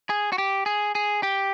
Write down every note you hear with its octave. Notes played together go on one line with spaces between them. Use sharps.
G#4
F#4
G4
G#4
G#4
G4